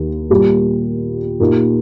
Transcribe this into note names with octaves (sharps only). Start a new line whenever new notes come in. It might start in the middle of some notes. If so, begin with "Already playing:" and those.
Already playing: D#2 D#3
A#2 G3 A#3 G4
A#2 A#3 D#4 G4